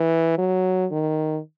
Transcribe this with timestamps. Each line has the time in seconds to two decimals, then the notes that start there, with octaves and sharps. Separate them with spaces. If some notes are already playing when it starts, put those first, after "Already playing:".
Already playing: E3
0.38 F#3
0.92 D#3